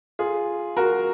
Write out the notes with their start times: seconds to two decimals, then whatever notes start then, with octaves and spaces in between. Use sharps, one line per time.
0.19 F4 G#4
0.77 F#4 A#4